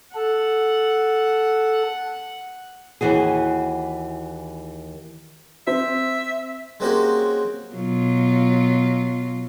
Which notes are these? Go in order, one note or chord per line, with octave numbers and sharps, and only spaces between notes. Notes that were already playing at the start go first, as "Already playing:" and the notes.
A4 F#5
D#2 A#2 E3 F#4 G#4
C4 E5
G#3 A#3 C4 C#4 F#4 G4
B2 F#3 F4